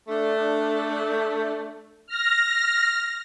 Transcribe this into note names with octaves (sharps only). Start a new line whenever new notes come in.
A3 D4
F6 A#6